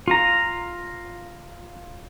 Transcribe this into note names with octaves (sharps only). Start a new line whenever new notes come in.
F4 A#5